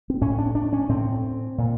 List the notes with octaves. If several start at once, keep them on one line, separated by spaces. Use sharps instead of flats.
C4
A2 C#4
D4
D4
C#4
A2 C4
A#2